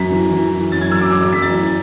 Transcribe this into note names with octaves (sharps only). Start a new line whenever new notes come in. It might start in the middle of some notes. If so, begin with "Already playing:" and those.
Already playing: F#2 B6
E3
E3
E3
F#2 A6
G#6
F#2 E6
D6
F#2 D6
E6
F#2 B6
A6
E3